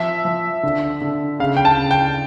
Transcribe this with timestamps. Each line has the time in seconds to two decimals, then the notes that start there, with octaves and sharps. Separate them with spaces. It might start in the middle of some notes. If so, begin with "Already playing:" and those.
Already playing: F3 E5
0.25 F3
0.63 D3
1.01 D3
1.39 C#3 F5
1.57 G5
1.65 A5
1.79 C#3
1.91 G5